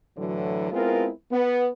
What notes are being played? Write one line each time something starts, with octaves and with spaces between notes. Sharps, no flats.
A2 D3 E3 F#3
G#3 B3 C4 E4 F4 A#4
B3